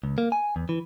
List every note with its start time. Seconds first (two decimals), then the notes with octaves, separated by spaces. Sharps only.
0.04 C#2
0.18 A#3
0.32 G#5
0.56 E2
0.69 E3